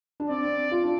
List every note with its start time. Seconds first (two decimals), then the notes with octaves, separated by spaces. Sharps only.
0.20 D4
0.29 C4 D5
0.43 C4
0.71 F4
0.84 D4